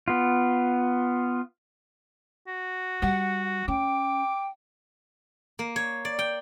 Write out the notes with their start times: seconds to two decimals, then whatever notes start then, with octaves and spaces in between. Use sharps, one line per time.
0.08 B3 F4
2.47 F#4
3.02 G3 F#5
3.68 C#4 G5 D6
5.59 A#3
5.76 C#5
6.05 D5
6.19 G5